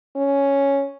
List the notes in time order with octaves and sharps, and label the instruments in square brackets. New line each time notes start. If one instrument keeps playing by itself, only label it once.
[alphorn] C#4